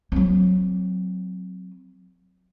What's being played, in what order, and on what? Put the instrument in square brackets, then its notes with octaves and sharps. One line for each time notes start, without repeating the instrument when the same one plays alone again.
[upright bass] F#3 C4